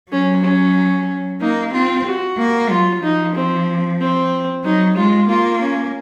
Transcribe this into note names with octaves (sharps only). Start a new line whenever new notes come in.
F#3 C#4
C#4
A#3 D#4
C4 F4
F#4
A#3
F#3 F4
F3 D#4
C4
C4
F#3 D#4
G#3 F4
A#3 F4
C#4